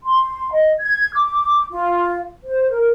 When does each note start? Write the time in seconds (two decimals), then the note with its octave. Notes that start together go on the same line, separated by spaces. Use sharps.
0.04 C6
0.52 D#5
0.80 G#6
1.14 D6
1.70 F4
2.45 C5
2.70 A#4